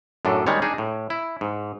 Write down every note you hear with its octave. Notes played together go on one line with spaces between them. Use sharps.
F#2 A2 D4 A4
D#3 G3 G#3 C#5
D4 D#4 G#4
A2
E4
G#2